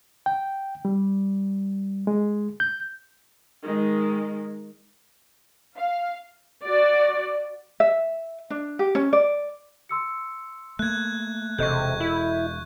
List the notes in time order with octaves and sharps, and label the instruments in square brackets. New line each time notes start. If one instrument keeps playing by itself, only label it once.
[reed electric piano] G5
G3
G#3
G6
[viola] D#3 G#3
[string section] F5
[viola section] F#4 D5
[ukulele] E5
D4
G4
C#4
D5
[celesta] C6 E6 C#7
[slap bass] A3 A#3 [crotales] F#6 G#6
[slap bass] E1 [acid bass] C3 [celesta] A4 D#5 [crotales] C#6 G6
[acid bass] E4